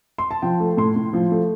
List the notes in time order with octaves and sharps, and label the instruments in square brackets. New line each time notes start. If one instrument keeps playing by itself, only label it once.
[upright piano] C6
A5
F3 G5
A3
A2 C6
A2
F3
A3